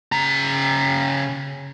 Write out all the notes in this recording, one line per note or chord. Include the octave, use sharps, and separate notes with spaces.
C#3 A#5